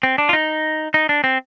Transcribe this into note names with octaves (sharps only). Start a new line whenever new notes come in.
C4
D4
F4
D#4
D#4
D4
C4